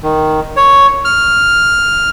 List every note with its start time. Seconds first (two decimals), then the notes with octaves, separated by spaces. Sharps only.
0.03 D#3
0.56 C#5
1.05 F6